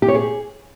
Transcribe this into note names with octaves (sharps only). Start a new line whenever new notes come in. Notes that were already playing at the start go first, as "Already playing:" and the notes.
G4
C#5
G#4